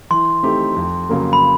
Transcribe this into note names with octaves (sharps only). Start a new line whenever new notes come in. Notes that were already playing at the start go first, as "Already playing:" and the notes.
E3 C6
A3 C4 D#4 G4
F2
C#3 F#3 A#3
B5